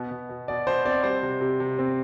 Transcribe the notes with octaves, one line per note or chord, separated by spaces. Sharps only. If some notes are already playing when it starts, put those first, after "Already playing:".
Already playing: B2 B3
B2
B2
B2 D5
B2 C5
C4 D5
G3 C5
C3
C3
C3
C4